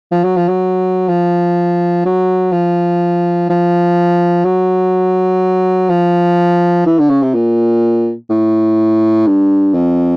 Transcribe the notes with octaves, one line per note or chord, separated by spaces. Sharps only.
F3
F#3
F3
F#3
F3
F#3
F3
F3
F#3
F3
E3
D3
C#3
C3
A#2
A2
G2
F2